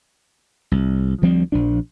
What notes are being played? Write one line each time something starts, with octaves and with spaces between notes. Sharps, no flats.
C2
D2 F3 G3 C4
A#1 F3 D4